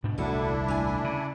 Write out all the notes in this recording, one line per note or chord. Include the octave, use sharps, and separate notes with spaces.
G#2 B2 D4
D#1 C2 A3 D4 E4 F#4
A3 G#5
C#3